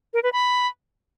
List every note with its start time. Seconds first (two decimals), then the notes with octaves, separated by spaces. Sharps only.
0.14 A#4
0.23 B4
0.33 B5